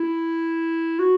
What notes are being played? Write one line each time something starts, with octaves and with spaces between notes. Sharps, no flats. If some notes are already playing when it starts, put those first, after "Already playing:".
Already playing: E4
F#4